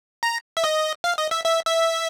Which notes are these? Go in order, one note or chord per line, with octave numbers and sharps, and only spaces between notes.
A#5
E5
D#5
F5
D#5
E5
E5
E5